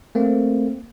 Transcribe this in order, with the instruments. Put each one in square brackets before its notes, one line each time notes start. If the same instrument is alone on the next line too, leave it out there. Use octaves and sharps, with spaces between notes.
[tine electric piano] A3 A#3 C4